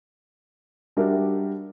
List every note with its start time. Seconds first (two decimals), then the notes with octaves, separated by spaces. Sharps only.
0.97 G3 D4 F#4 G4 A#4 E5